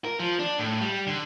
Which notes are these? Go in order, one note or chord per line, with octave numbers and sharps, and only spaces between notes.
A#4
F3
D4
A2
G3
D3